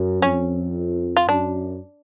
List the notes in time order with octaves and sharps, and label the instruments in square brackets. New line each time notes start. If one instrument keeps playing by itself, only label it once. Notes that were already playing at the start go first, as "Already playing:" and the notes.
Already playing: [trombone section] F#2
[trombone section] F2 [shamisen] C#4
[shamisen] F4
[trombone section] F#2 [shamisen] D4